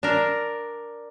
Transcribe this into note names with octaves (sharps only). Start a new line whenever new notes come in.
D4 A#4